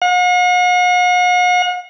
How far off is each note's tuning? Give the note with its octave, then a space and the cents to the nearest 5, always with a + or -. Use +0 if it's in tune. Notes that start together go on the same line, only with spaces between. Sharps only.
F#5 -45